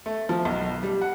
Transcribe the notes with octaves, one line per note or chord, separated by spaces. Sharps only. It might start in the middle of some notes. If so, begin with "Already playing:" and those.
A3
F3
B1
G3
F#5